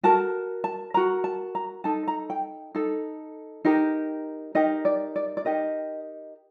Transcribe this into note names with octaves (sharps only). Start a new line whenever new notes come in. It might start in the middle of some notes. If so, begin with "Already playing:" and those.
F#4 A#4 A5
A5
F#4 A#4 A#5
A5
A#5
D#4 A4 A5
A#5
G5
D#4 A4
D#4 G4 A#4
D#4 G4 A#4 D#5
D5
D5
D5
D#4 G4 A#4 D#5